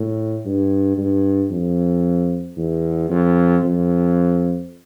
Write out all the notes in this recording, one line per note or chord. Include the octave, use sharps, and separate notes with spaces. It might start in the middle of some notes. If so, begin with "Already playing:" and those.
Already playing: A2
G2
G2
F2
E2
F2
F2